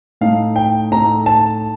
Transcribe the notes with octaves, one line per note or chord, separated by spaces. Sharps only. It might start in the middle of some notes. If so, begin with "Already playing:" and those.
A2 A3 D#4 F5
G5
A2 A3 D#4 A#5
A5